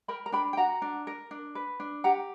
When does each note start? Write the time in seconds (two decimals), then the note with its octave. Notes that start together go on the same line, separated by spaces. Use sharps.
0.08 A#4 G5 B5
0.26 A#5
0.32 D4 G5 B5
0.53 G5
0.57 F#4 F#5 A#5
0.82 D4
1.07 A#4
1.31 D4
1.55 B4
1.80 D4
2.04 G4 F#5 A#5